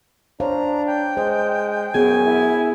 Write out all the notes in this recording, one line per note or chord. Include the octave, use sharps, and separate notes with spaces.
D4 C5 C#5 F5 A#5
G5
G#3 C5
F#2 B3 G#4 G#5
E4